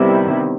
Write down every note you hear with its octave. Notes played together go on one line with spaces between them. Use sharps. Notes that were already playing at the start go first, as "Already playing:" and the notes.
Already playing: C3 D#3 G3 B3 E4